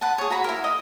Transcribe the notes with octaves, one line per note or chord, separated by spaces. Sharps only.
B4 F#5 A5
G#4 C#5
F#4 A#5 B5
E4 A#4
D#5